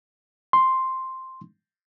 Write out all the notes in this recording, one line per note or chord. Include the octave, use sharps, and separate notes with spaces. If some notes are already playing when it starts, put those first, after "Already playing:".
C6